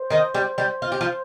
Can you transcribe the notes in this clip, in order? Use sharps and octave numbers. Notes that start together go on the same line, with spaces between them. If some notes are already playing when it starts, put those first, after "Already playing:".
Already playing: C5
D#3 D#4
G3 G4
G3 G4
F4
G4
F3 F4